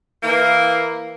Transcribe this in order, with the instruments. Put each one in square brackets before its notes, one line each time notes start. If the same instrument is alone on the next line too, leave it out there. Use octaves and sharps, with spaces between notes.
[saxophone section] E3 A#3